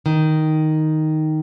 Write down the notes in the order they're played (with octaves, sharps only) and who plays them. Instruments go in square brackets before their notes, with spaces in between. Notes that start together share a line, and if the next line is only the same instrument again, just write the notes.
[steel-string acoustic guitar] D#3